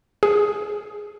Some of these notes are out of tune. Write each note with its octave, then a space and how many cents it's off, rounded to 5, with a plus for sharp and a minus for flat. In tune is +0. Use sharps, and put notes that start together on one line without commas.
G#4 +10